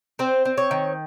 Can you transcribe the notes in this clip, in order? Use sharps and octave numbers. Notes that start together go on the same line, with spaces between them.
C4 C5
C4
C#5
D#3